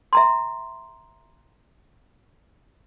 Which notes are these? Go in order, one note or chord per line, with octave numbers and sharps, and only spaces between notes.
E5 A#5 C6